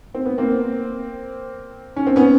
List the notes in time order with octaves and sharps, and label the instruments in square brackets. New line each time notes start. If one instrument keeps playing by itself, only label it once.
[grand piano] C4
B3
A#3 C4
C#4
C4
B3 C#4